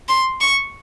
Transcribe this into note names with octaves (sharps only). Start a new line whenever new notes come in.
C6
C#6